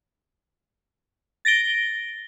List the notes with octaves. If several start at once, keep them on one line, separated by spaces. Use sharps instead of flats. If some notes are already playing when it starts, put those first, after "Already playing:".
A6 A#6 D7 G7